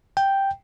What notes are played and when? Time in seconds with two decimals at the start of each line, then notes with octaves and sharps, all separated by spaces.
0.17 G5